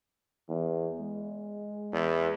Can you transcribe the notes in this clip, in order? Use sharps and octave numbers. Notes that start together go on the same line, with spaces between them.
E2
G#3
E2